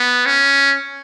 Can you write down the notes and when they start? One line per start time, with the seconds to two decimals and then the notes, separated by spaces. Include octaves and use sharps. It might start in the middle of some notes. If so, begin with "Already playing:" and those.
Already playing: B3
0.26 C#4